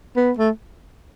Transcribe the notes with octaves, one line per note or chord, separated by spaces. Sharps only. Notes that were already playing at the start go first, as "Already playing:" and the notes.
B3
A3